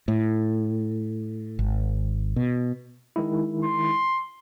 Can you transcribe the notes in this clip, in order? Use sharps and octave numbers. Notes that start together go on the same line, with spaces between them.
A2
G#1
B2
D#3 G#3 E4
C6